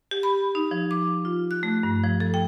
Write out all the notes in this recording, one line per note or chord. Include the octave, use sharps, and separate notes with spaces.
G4
B5
D#4
F3
D6
F4
F#6
A3
G2
F3
A4
G5